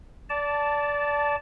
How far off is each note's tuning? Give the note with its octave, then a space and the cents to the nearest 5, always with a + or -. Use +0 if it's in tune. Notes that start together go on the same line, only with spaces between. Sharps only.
D5 -20 A5 +0